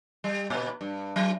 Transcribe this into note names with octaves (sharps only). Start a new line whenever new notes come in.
G3
A#2 B4
G2
F#3